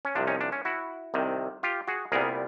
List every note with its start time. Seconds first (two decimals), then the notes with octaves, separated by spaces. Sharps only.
0.05 C#4
0.15 C2 C3 F3 D4
0.27 C#4 D#4
0.41 D4
0.52 C#4
0.65 E4 F#4
1.14 C2 C3 D#3
1.63 F4 G4
1.88 F#4 G#4
2.12 C2 A#2 G3 B3 G#4 A#4